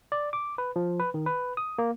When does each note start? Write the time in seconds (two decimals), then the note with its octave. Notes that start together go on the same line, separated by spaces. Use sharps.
0.12 D5
0.33 D6
0.58 B4
0.76 F3
0.99 B4
1.14 D#3
1.26 B4
1.57 D#6
1.78 A#3